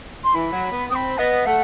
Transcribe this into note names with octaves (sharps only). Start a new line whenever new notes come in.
C6
E3 B5
F#3
B3
C4 B5 D#6
B3 D#5
A3 F#5